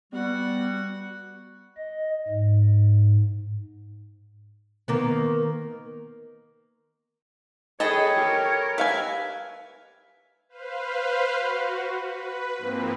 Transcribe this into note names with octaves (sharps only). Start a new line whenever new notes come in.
G3 B3 F#4 F#5
D#5
G#2
D#3 A#3 B3
D#4 G#4 A4 B4 C#5 D#5 G5
G4 A#4
B4 E5 F5 G#5
B4 C5 F5
F#4
B4
G#2 F3 A#3 C4